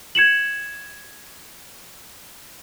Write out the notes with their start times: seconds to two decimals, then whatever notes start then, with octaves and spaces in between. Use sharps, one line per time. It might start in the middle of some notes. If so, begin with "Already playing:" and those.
0.15 G#6 C#7 E7 F#7